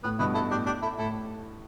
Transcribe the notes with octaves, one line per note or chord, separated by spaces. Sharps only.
A2 B3
G2 B2 B3 E4
E4 A4
A2 D4 G4
D4 G4
E4 A4
A2 E4 A4